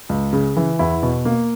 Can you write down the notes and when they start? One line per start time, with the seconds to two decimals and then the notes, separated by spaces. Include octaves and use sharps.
0.09 C#2
0.33 C#3
0.56 E3
0.79 E2 E4
1.03 B2
1.25 A#3